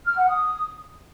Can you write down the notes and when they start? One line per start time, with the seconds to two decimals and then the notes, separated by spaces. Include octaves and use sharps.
0.06 F6
0.17 F#5
0.28 D#6